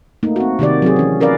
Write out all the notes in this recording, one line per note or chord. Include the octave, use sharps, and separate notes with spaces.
A3 A#3 D#4
C4 F#4
C3 D#3 G4 D5
F#3 C4 G#4
E3 C#4
C#4 A#4 B4 D5 F5